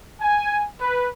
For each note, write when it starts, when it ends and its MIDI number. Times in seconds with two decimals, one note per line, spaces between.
0.21 0.65 80
0.81 1.09 71